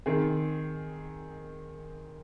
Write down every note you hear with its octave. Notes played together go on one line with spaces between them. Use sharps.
D#3 C4 G#4